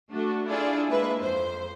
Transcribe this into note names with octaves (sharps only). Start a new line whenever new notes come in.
A3 D4 F#4
D4 E4 F4 G#4 A4 D5
G#3 A#3 E4 B4 E5
F2 C5